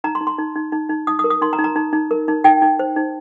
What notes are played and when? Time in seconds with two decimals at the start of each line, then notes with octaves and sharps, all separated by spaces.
0.04 D#4 A#5
0.15 C6
0.21 D#4
0.27 C6
0.38 D#4
0.55 D#4
0.72 D#4
0.89 D#4
1.07 D#4 D#6
1.19 D#6
1.24 A#4
1.30 D#6
1.42 D#4 C6
1.53 A#5
1.58 D#4
1.64 A#5
1.76 D#4
1.93 D#4
2.11 A#4
2.28 D#4
2.44 D#4 G5
2.62 D#4
2.79 C5
2.96 D#4